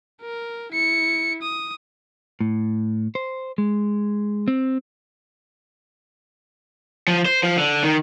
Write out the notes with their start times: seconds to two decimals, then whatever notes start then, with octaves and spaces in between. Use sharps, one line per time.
0.21 A#4
0.72 E4 C#7
1.42 D#6
2.41 A2
3.15 C5
3.58 G#3
4.48 C4
7.08 F3
7.26 C5
7.43 F3
7.57 D3
7.84 D#3